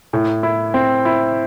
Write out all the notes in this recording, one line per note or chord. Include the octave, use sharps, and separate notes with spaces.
A2
E4
C4
E4